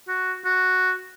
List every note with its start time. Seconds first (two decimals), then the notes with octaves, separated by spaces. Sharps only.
0.08 F#4
0.45 F#4